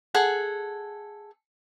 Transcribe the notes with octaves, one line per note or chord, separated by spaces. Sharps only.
G#4 A4 F#5